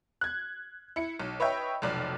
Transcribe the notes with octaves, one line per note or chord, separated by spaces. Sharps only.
F#6 G#6
E4 C#7
B1
B4 C#5 D#5 E5 G5
F1 B1 D5